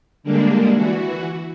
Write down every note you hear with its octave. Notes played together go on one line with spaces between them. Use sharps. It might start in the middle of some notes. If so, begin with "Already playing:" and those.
D3 G3 G#3 A#3 D4
E3 F#4